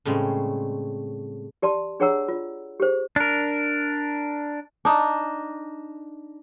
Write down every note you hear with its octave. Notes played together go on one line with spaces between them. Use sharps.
A2 C#3 G3 G#3 C4
G4 D5 A5 C6
D4 G#4 C#5 F#5 A#5 E6
F4
G4 G#4 C5
D4 A#4
D4 D#4